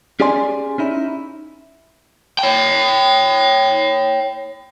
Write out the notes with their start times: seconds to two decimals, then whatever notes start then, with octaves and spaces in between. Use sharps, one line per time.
0.20 C#4 G4 G#4 D5 G#5 C6
0.78 C#4 D#4 E4
2.39 C#5 G5